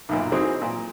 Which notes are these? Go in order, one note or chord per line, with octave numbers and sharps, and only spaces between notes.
B1 F#2 A#2
E3 F#3 C4 D#4 G#4
A#2